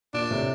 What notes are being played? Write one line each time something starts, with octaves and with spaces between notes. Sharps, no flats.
A#2 D4
A2 C3